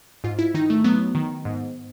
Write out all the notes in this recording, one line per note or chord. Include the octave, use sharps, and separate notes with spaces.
G#2 F4
E4
D#3 D#4
A3
F#3 B3
D#3
G#2